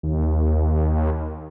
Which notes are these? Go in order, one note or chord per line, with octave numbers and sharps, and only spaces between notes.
D#2